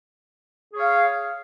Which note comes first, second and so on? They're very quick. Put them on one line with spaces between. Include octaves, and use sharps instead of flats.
G#4 C#5 F5